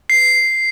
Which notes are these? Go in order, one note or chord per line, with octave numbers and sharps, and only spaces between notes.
C7